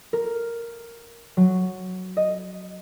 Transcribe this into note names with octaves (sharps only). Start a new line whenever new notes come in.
A#4
F#3
D#5